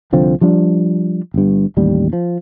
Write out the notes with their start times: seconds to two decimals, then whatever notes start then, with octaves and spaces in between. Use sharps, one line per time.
0.12 C2 D3 F3 C4
0.41 F3 G3 D4
1.34 G1 G2
1.77 A1 D#2 G3
2.13 F3